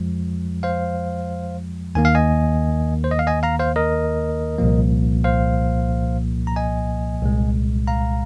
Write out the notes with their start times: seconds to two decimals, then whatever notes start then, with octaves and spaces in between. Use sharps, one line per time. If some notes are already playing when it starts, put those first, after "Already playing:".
Already playing: F2 F3 G#3
0.63 C5 F5
1.95 D#2 D#3 A#3 G#5
2.05 F5
2.15 D#5 G#5
3.04 C5
3.11 D#5
3.19 F5
3.27 D#5 G#5
3.43 F5 A#5
3.59 C5 F5
3.76 A#4 D#5
4.58 C2 A#2 F3 A#3
5.24 C5 F5
6.47 A#5
6.56 D#5 G#5
7.22 C2 A#2 G#3
7.87 F5 A#5